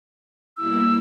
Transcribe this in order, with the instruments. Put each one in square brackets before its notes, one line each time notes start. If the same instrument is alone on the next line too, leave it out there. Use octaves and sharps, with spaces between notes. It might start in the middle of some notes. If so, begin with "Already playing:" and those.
[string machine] B2 G3 A#3 E4 [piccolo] E6